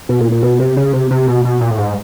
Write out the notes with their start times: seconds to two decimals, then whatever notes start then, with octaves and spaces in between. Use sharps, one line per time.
0.09 B2
0.20 A#2
0.32 A#2
0.43 B2
0.59 C3
0.77 C#3
0.93 C3
1.11 C3
1.28 B2
1.45 B2
1.61 A#2
1.71 A2
1.78 G#2